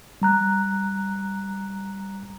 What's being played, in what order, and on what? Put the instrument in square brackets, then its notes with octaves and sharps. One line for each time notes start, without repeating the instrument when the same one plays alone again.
[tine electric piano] G3 A#5 F#6